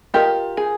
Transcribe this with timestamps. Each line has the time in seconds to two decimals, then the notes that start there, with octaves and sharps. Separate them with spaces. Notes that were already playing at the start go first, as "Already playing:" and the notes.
0.14 F4 G4 A#4 D#5
0.57 G#4